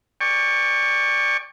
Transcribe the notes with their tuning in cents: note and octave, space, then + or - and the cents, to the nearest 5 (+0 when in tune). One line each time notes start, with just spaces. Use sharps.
D5 +0 G5 +35 C#6 +0